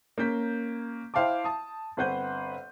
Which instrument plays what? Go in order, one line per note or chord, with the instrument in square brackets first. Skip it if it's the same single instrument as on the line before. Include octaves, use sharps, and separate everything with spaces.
[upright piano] A#3 C#4 G6 B6
E4 C5 F5 G5 A5 D6
A5 D#6
G1 C4 B4 C5 F#5 G6